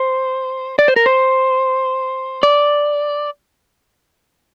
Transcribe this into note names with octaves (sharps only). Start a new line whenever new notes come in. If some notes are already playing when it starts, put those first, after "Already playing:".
Already playing: C5
D5
C5
A#4
C5
D5